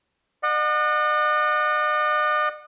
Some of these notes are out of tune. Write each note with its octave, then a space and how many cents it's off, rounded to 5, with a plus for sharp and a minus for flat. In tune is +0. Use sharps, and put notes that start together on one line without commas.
D#5 -45 F#5 -20